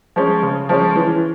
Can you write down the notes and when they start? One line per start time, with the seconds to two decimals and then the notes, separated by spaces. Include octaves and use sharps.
0.16 F3 G#3 C#4
0.43 C#3
0.69 F3 G#3 C#4
0.96 E3